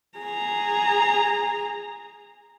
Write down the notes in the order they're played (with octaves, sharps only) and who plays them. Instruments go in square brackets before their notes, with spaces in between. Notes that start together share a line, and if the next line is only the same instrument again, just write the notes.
[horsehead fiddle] G#4 A#5